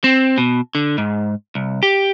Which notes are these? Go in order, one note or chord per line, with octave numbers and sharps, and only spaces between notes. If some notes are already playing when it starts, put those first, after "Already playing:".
C4
B2
D3
G#2
C2
G4